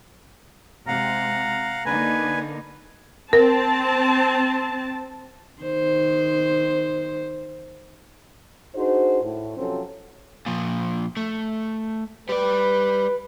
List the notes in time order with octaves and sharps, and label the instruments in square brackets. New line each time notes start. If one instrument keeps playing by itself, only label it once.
[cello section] C3 G#3 [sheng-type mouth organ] F5 F#5 [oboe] A#5
[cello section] D3 A#3 D#4 [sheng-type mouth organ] B4 G#5
[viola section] C4 A5 [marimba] A#4
[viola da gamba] D#3 C5
[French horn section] D4 D#4 F#4 G#4 C5
A2
C3 F3 F#3 C4 C#4 A4
[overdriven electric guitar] A#2 F3
A3
[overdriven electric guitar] G3 D5 [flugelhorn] B4